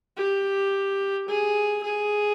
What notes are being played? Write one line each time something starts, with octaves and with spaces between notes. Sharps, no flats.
G4
G#4
G#4